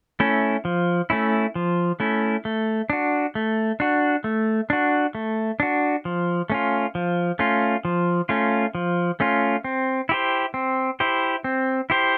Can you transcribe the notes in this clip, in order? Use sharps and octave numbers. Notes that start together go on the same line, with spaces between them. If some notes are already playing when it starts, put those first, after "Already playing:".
A3 C#4 E4
F3
A3 C#4 E4
F3
A3 C#4 E4
A3
D4 F#4
A3
D4 F#4
A3
D4 F#4
A3
D4 F#4
F3
A3 C#4 F4
F3
A3 C#4 F4
F3
A3 C#4 F4
F3
A3 C#4 F4
C4
E4 G4 C5
C4
E4 G4 C5
C4
E4 G4 C5